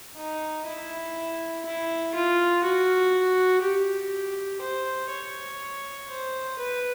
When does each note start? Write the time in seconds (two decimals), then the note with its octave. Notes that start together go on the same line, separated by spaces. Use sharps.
0.17 D#4
0.67 E4
1.65 E4
2.14 F4
2.63 F#4
3.62 G4
4.61 C5
5.11 C#5
6.09 C5
6.59 B4